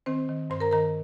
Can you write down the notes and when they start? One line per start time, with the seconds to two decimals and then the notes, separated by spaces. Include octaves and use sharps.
0.06 D#3 C4 C5
0.29 D#3
0.50 G2 C5 C6
0.60 A#4 A#5
0.71 D#3 A#4 A#5